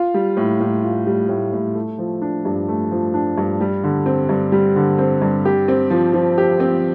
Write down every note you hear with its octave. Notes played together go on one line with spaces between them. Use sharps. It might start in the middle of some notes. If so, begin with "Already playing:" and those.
Already playing: F4
G3
A2
A2
F4
G3
A2
A2
A3
F3
D4
G2
A3
F3
D4
G2
G3
D3
C4
G2
G3
D3
C4
G2
G4
C4
F3
F3
G4
C4